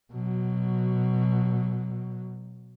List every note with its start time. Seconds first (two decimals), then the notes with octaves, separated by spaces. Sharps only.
0.13 B2 F#3